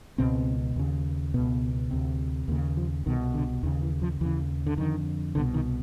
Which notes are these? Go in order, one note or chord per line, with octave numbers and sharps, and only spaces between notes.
C#2 B2 C4
D#2 C#3
C#2 B2 B3
D2 C3
D#2 C#3 A#3
F3
C2 B2 D#3
D3
D#2 C#3 D#3
E3
F3
D#2 C#3 E3
D3
F2 D3 D#3
C2 B2 D3
D#3